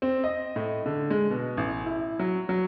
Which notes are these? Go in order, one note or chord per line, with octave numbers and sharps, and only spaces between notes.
C4
D#5
A2
D3
G#3
B2
A1
E4
F#3
F#3